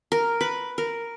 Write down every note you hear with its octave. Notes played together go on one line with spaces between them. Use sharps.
A#4
B4
A#4